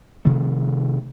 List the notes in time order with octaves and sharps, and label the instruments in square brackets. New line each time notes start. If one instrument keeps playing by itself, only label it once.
[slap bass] C3 D#3 F3 A3